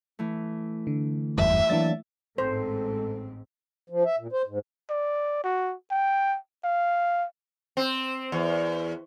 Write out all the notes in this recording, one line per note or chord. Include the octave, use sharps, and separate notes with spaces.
E3 A3
D3
F#1 E2 G2 E5
E3 F#3 A#3 D4 A6
A1 G#2 C4 A4 C5
F3
E5
A#2
C5
G#2
D5
F#4
G5
F5
C4
E2